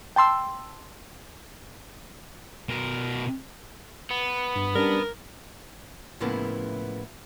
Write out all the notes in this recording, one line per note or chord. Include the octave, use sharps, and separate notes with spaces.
G5 A5 C6 E6
B2 A#4
B3
G2
G3 C#4 D4 A#4
A2 C#3 F3 A#3 B3 E4